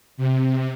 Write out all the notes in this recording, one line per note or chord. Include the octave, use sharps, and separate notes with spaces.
C3